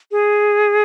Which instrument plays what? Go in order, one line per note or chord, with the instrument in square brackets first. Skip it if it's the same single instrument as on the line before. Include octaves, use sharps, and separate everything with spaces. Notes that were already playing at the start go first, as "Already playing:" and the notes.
[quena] G#4